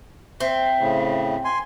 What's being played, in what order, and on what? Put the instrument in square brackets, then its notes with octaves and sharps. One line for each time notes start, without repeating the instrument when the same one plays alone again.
[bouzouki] C4 [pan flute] E5
[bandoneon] A2 C#3
G#5 C6